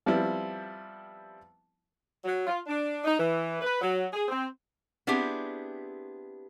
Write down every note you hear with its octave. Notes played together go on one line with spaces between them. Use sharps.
F3 G3 B3 C4 E4
F#3
F4
D4
D#4
E3
B4
F#3
G#4
C4
B3 C4 D4 E4 G4 G#4